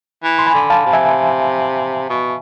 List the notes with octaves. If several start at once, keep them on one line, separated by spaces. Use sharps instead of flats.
E3
C6
G#5 B5
D3
F5 A5
C3
E5 G#5
B2